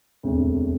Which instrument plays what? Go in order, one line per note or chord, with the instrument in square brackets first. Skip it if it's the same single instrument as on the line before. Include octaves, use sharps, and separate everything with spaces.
[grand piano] E1 D2 C3